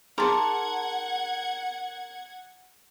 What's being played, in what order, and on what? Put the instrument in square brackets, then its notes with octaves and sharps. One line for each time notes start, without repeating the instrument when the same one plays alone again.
[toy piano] D#4 G#4 C6 [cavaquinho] A#4 A5 [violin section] F#5 G#6